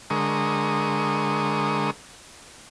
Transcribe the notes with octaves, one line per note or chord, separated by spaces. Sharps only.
D3 G#3 A#4 C#6 D#6